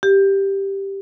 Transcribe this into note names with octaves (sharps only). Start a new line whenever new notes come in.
G4